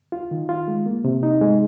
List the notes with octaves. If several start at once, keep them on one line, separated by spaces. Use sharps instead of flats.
F4
D#3
F4
G#3
A#3
C3
D#4
G#3